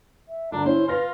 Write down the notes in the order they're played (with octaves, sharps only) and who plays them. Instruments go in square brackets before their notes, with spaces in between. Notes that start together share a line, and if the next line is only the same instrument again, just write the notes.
[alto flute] E5
[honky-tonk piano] G2 D3 [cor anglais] D4 [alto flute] A#5
[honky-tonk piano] C#4 [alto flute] E4 [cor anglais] C5
[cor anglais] F4 [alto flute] B4 [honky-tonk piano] C6 F6 A#6